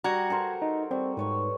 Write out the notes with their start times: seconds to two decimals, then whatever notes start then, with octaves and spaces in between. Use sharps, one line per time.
0.04 G3 F#4 A#5 G#6
0.30 A4 A#4 C5
0.62 D#4
0.91 G3 C4 C#6
1.17 G#2 B4 C#5 C#6